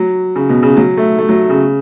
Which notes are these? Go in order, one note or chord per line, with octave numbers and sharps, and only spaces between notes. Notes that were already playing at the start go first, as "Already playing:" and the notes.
Already playing: F#3
C#3
B2
C#3
F#3
A3
A3
F#3
C#3